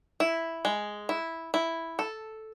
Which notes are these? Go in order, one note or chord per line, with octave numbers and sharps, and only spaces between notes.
E4
G#3
E4
E4
A4